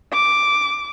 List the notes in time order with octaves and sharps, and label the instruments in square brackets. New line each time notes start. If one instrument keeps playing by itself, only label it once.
[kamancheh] D6